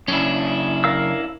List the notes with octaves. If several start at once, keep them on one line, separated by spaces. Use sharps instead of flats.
F#2 C#3 C#4 D4 E4
A#4 F5 E6